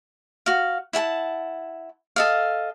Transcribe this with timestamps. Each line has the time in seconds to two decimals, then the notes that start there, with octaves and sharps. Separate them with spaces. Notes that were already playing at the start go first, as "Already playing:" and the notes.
0.46 F#4 F5
0.93 E4 F#5 G#5 A5
2.16 A4 D#5 F5